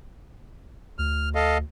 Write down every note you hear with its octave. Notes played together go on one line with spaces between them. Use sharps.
D2 F6
A4 D#5 F5